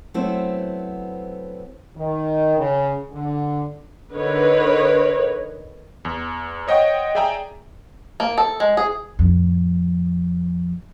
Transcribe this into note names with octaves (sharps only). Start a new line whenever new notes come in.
F#3 A3 B3 C4 E4 C5
D#3
C#3
D3
D3 D#4 A#4 B4 C#5
E2
C5 C#5 D#5 F#5 G5 C#6
G#4 D5 E5 G5 G#5 A#5
A#3
A4
G#3
G#4
F2 A2